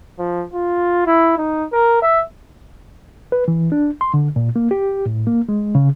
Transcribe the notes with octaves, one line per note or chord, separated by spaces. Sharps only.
F3
F4
E4
D#4
A#4
E5
B4
E3
D4
C6
D3
A#2
A#3
G4
A2
A#3
G#3
C#3